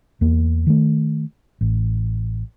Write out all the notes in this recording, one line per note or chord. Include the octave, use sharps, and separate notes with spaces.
E2 A#3
D#3 A3
A1